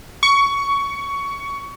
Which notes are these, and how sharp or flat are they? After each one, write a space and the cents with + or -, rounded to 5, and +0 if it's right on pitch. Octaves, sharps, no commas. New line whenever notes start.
C#6 +15